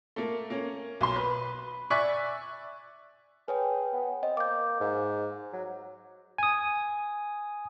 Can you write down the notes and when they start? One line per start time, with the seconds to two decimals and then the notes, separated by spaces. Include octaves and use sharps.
0.16 A3 A#3
0.50 A#3 C#4
1.01 B1 C6
1.16 B4
1.90 D5 E5 G#5 C#6 F#6 B6
3.48 G#4 B4 C#5 G5
3.93 B3
4.23 C4 D#5
4.37 A#3 D6 G6
4.80 G#2
5.53 F#3
6.38 G#5 D#6